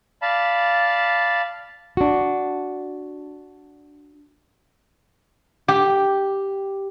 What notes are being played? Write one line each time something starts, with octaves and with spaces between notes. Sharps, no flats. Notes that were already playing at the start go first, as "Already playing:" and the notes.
D5 F5 A5 B5
D4 F#4
G4